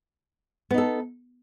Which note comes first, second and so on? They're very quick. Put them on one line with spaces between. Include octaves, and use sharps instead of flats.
B3 D#4 A4